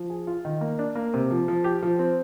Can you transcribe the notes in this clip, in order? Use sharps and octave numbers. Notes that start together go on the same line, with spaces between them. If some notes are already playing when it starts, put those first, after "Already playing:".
Already playing: F3
G#4
F4
D#3
A#3
D4
A#3
C3
F3
F3
G4
F3
C4